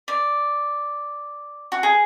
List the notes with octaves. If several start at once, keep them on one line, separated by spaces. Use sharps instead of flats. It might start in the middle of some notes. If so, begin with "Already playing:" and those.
D5
F#4
G#4